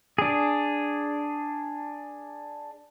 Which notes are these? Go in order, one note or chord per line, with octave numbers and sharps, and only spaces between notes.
D4 G#4